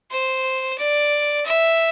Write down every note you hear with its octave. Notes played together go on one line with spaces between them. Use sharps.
C5
D5
E5